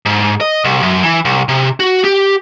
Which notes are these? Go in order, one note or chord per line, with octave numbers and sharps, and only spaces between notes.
G#2
D#5
C2
F#2
E3
C2
C3
F#4
G4